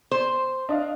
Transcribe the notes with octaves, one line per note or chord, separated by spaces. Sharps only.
C5
D4 D#5 F5